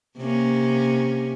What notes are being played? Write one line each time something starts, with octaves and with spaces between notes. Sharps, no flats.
C3 A#3 C#4